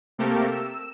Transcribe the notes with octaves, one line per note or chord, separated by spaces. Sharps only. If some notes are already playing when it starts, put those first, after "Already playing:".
C3 A3 A#3 G4 A4 A#4
E6